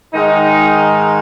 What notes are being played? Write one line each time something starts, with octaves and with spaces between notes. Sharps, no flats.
G#2 D#3 G#3 D#4